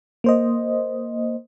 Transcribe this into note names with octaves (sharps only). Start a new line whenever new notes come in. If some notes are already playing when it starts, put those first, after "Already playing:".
A#3 C5 D#5